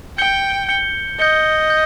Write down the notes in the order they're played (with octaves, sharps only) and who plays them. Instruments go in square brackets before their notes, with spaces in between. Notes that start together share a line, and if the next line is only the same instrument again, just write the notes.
[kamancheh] G5 [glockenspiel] G6 C#7 G7
[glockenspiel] G6 C#7 G7
[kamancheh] D#5 [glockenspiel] G6 C#7 G7
[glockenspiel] G6